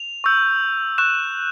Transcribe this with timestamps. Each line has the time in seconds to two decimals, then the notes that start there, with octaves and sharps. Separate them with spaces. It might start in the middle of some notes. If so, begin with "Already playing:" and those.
Already playing: F7
0.24 C#6 E6 G6
0.98 C#6 F#6 E7